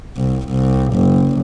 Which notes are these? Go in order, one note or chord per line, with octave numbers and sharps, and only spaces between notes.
C2
C2
F#1